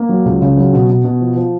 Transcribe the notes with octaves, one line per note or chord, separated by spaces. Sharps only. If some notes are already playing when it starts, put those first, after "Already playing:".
Already playing: A#3
F#3
C#2
C#3
F#3
B2
B2
B2
F3
F3